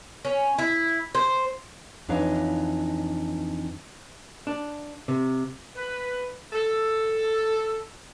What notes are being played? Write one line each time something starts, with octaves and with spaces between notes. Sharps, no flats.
C#4
E4
C5
F2 E3 D4 D#4 C#5 F5
D4
C3
B4
A4